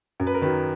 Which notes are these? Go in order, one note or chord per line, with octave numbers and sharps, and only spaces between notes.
F#2
B4
A#4
D#3 F#3 B4